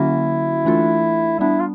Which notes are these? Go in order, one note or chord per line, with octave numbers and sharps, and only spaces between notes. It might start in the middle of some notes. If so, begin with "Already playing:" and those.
Already playing: D3 F#3 A#3 C#4 E4 F#4
E3 A3 D4 F4 A4
G3 B3 D4 E4
F4